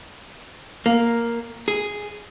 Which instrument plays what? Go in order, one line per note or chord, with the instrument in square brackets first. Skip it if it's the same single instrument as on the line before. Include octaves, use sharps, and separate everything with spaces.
[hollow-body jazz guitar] A#3
G#4